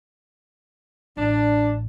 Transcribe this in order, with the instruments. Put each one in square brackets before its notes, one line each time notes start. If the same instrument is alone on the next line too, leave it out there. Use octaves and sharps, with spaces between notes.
[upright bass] A1 [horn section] D4